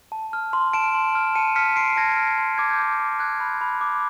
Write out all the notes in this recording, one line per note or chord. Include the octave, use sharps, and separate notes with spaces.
A5
F6
C6
A5 D7 E7
C6
F6
A5 C#7 D#7
F6 B6 C#7
C6 C7 D7
A5 G#6 A#6
F6
C6
D6 G#6
G6
D6 G#6
D6
F#6 G#6
B5
B5
D6